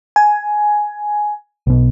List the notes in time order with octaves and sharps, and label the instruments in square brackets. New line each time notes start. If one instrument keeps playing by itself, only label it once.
[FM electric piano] G#5
[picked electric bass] B1 B2